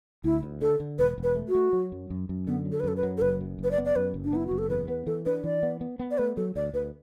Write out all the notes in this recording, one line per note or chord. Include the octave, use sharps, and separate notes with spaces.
D2 E4
D2
D3 A4
D3
E1 B4
E1
B4
A3
F#4
A3
F#3
F#2
F#2
F#2
D3 B3
F#3
A4
B4
F#2 A4
B4
F#3
A4
F#1 B4
F#2
F#1
B4
D5
B3
D5
F#2 B4
F#1
D4
B3 E4
F#1 F#4
A4
E2 B4
B3 B4
E3 A4
D4 B4
E3 D5
B3
B3
B3
D5
A3 B4
F#3 A4
D2 D5
D2 B4